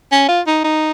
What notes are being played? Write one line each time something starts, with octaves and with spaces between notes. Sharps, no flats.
C#4
F4
D#4
D#4